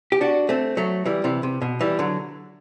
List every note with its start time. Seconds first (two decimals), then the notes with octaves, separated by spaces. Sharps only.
0.12 G4
0.21 D4 F#4
0.49 A3 C4
0.77 F#3 A3
1.05 E3 G3
1.24 C3 E3
1.43 C3
1.61 B2
1.81 E3 G3
1.99 D3 F#3